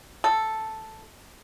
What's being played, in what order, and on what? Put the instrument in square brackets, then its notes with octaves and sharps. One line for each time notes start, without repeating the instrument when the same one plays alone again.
[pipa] A4